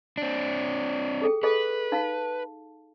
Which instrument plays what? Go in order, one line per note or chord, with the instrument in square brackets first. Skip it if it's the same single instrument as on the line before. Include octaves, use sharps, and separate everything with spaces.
[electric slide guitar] C4 D4
[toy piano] G#4 A4 G5
[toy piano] G#4 A4 D#5 [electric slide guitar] B4
[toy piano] D#4 F5 A5